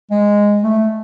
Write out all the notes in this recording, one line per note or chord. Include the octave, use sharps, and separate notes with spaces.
G#3
A3